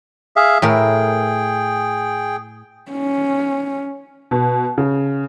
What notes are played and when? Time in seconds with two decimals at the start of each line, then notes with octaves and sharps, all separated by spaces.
0.36 G#4 E5 F5
0.62 A2 A3 G#4 A#4 G5
2.92 C#4
4.31 B2
4.78 C#3